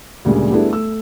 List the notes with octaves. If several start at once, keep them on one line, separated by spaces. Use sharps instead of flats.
D2 A#2 C#3 G3 G#3
G3 A3 B3 D4 E4 G#4
A3 E6